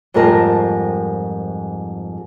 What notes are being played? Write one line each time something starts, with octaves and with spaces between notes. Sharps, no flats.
F2 G#2 G3 F4 A#4 A5